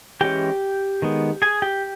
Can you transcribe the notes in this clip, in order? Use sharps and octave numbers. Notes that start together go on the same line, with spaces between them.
E3 G#3 C#4 G4 G5
D#3 G#3 B3
G#4 G#5
G4 G5